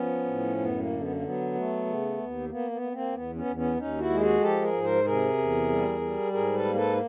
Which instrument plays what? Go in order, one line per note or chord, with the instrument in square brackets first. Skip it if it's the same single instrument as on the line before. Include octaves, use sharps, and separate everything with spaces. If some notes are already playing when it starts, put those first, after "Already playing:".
Already playing: [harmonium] F3 B3 C#4
A2
F#2 B3
A#3
D3
B3
A#3
F#3 B3
A3
C#3
D#2
A#3 B3
B3
A#3
A#3 C4
E2 B3
B3 C#4
E2
B3 C#4
D#2 C#4 D#4
E4 F#4
G#3
F#4 G#4
F3 G4 A4
G#4 A#4
G#2
A#4 C5
C3 G#4 A#4
E2
G3
G3
G#2 G#4 A#4
A4 B4
A#3
A4 B4